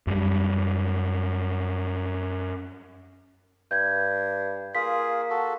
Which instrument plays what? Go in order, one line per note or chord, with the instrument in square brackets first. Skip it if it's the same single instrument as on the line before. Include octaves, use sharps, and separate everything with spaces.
[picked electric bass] F#2 G3
[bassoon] G2 [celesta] G6 G#6
[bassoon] A#3 [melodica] F4 G#4 [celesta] B6
[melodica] F#4 A4